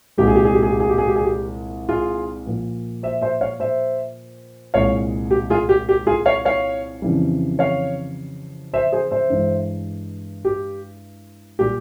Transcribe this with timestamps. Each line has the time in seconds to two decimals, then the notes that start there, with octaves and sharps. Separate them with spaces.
0.18 C2 A#2 G#3 G4
0.27 G#4
0.36 G4
0.45 G#4
0.54 G4
0.63 G#4
0.71 G4
0.80 G#4
0.89 G4
0.98 G#4
1.08 G4
1.16 G#4
1.25 G4
1.89 F4 G#4
2.46 A#2 F3 A#3
3.03 C5 E5
3.22 C5 E5
3.41 C#5 F5
3.60 C5 E5
4.74 C2 A#2 G#3 C#5 F5
5.31 G4
5.50 F4 G#4
5.69 G4
5.89 G4
6.07 F4 G#4
6.26 C#5 F5
6.45 C#5 F5
7.02 F2 C#3 E3 G3
7.59 C#5 F5
8.73 C5 E5
8.92 G#4 C5
9.11 C5 E5
9.30 G2 E3 G#3
10.45 G4
11.59 A#2 G3 G4